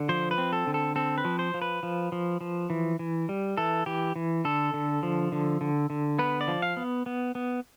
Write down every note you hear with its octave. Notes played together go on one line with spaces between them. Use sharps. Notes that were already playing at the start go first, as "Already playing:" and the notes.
Already playing: D3
F3 C5
B4
C4
A4
D3
A4
C4 A4
B4
F3
C5
F3
B4
F3
F3
F3
E3
E3
G3
E3 A4
E3 G4
E3
D3 A4
D3
F3
D3
D3
D3
B3 B4
D5
F3
F5
B3
B3
B3